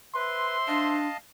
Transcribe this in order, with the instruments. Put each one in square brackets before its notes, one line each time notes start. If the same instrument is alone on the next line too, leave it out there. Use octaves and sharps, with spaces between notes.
[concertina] B4 [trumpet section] C5 E5 C6
[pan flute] D4 [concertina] D#5 F5 A5